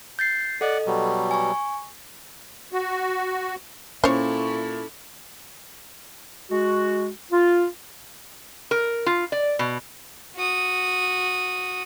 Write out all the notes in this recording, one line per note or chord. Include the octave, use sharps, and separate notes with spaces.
G6 A6 C7
A4 D5 D#5 F#5
B2 F#3 G3
G#5 C#6
F#4
A#2 C#4 E4 A4 C5 C#5 C#6
G#3 F#4
F4
A#4
F4
D5
B2
F#4 D#6